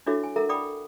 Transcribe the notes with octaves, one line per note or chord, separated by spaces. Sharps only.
D4 E4 F#4 A4 C#5 E5
G#5
A4 A#4 E5 F#5 A#5
D5 F#5 G5 B5 D6 D#6